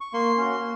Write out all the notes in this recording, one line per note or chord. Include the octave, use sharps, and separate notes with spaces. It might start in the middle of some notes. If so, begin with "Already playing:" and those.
C#6
A#3 C6
C#4 F#4
A#3